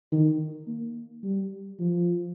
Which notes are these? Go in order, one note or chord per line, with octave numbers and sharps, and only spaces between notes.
D#3
A#3
G3
F3